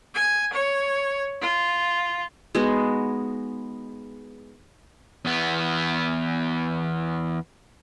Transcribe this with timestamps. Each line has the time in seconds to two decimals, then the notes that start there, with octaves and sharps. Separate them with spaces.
0.14 G#5
0.53 C#5
1.41 F4
2.55 G#3 B3 D#4 F#4
5.25 E2 B3